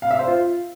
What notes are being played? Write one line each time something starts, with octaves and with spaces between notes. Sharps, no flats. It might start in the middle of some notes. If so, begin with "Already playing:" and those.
F5
E5
C5
F4